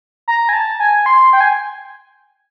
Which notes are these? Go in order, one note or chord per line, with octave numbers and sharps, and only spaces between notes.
A#5
G#5
A5
G#5
C6
G5
G#5